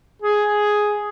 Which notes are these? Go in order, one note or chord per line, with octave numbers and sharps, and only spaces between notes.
G#4